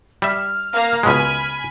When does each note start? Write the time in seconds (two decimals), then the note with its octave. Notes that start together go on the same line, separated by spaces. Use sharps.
0.22 G3 E5 F6
0.72 A#3 F5 A#5
1.03 C#2 B2 G#3 G#5 B5